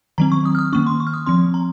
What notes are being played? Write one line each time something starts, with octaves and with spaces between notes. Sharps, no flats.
D#3 F#3 C4 A#5
C#6
D#6
F6
D#6
D#3 A#3 C#4 C#6
C6
C#6
F6
D#6
F3 C4 C6
A#5